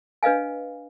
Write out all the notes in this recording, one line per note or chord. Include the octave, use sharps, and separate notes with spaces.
D4 B4 D#5 F5 G#5